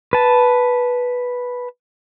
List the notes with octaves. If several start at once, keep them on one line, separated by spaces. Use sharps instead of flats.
B4 A5